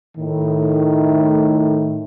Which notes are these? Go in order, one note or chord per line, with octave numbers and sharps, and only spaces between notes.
A2 D#3